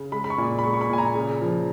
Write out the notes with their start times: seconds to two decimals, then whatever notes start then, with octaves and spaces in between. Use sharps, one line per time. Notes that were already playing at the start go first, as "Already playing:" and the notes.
Already playing: C#3
0.12 G#3 B5
0.24 B5
0.30 C#6
0.38 A#2
0.59 B5
0.64 G#3 C#6
0.74 C#6
0.81 B5
0.90 A#2 G#5
0.98 A#5
1.15 C#3
1.41 F3